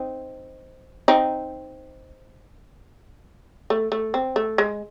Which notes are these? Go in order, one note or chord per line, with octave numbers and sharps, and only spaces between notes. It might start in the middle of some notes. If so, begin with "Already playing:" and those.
Already playing: C4 D#4
C4 D#4
A3
A3
C4
A3
G#3